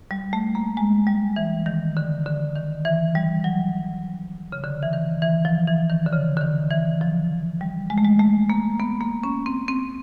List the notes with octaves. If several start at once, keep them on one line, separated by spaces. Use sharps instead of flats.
G3
A3
A#3
G#3
G3
E3
D#3
D3
D3
D#3
E3
G3
F#3
C#3
D3
E3
D#3
E3
F3
E3
D#3
D3
C#3
D3
D#3
E3
F3
G3
G#3
A3
G#3
A3
A#3
B3
A#3
C#4
C4
C4